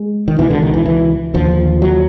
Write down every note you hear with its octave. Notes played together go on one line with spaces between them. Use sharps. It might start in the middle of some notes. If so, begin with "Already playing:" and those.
Already playing: G#3
D#3
C#2 B2 E3
D3
D#3
E3
E3
D#2 D3 F3
F#3